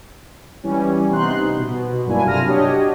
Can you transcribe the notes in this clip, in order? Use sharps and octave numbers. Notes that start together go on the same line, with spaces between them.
E3 G3 C#4
C3 B3 D#4 C6 F#6
B2
G2 F#3 A#3 D4 E4 G#5
C3 A3 F4 F6 A#6 D#7
D4 F#4 G4 C#5 D#5